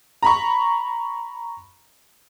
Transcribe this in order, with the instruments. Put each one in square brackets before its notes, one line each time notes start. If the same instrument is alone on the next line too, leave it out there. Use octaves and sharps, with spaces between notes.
[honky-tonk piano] A#5 B5 C#6